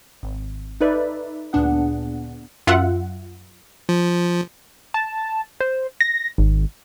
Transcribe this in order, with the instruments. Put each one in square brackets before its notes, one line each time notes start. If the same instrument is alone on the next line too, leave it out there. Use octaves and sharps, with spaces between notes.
[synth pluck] G#1
D#4 A4 B4 D5 E5
D2 A#2 B3 D4 G#4 F#5
F#2 F4 E5 F#5
[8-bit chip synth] F3
[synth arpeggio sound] A5
C5
A#6
G#1